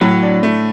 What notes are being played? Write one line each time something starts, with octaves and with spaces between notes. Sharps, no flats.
A2 F#3
D4
A3